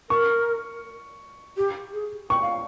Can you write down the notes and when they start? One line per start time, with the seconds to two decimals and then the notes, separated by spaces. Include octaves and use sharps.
0.10 A#4 C#6
1.57 G4
1.93 G#4
2.30 G5 C#6
2.42 F5